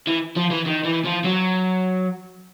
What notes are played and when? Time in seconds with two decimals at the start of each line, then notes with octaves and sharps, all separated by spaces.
0.07 E3
0.36 F3
0.50 E3
0.66 D#3
0.85 E3
1.05 F3
1.24 F#3